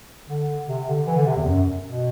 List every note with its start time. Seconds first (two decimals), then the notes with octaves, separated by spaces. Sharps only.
0.28 D3
0.68 C3
0.87 D3
1.07 E3
1.17 D3
1.27 C3
1.37 E2
1.47 F#2
1.86 B2